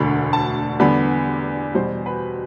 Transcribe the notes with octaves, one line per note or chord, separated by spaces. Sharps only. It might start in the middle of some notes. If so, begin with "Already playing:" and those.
Already playing: E1 D2 D3 B5
A5
E2 D3 G3 B3 B5
E2 B2 G3 C5
B4